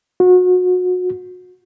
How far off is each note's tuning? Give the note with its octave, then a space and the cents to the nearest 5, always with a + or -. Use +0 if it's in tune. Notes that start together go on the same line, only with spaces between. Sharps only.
F#4 -30